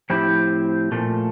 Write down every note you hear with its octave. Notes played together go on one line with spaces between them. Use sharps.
A2 F3 C4 E4 G4
A#2 F3 A3